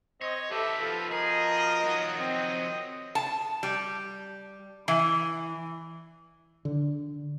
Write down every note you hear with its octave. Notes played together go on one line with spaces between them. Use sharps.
C4 C#5 D#5
D#4 G4 A4 B4 E5
B2 F3 A4
G#4 A#4 D#5
D#3 F3 F#3 F#4
C4 D#5
A5
G3
E3
D3